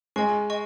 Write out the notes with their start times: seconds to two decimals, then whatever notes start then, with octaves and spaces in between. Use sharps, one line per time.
0.16 G#3 D#5 G#5 C#6
0.50 D#5 G#5 C#6